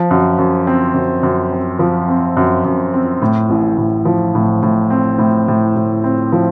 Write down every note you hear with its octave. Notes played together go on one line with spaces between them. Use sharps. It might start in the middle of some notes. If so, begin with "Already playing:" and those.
Already playing: F3
F#2
F#2
C4
F#2
F#2
C4
F3
C4
F#2
F#2
C4
A2
A1
A2
F3
A2
A2
C4
A2
A2
A2
C4
F3